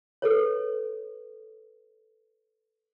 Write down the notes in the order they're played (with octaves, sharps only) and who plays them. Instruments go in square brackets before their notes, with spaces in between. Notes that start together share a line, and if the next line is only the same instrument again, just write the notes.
[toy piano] A4 B4 C#5